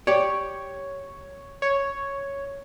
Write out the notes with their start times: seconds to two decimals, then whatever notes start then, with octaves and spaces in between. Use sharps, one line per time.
0.07 G4 C#5 D5
1.62 C#5